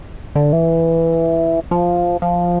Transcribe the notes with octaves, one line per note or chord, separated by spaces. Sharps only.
D3
E3
F3
F3